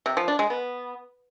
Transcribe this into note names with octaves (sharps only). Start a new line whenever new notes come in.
C3
F3
D4
G#3
B3